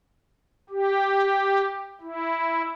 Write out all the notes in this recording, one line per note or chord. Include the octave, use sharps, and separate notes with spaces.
G4
E4